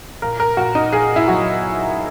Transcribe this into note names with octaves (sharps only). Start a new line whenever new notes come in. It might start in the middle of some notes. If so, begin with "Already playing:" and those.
A#2 A#4
A#4
A#2 F#4
D#4
A#2 G#4
E4
F#3 F#4